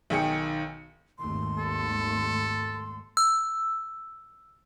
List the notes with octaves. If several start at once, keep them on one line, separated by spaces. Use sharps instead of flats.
B1 D#3 G#4 G5 C#7
G#1 D#2 A3 C6
A4
E6